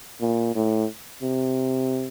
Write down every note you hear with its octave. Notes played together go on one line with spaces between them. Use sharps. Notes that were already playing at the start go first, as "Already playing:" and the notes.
A#2
A2
C3